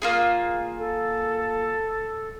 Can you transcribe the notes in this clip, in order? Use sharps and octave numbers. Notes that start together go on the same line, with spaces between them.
A#3 F4 G#4
A4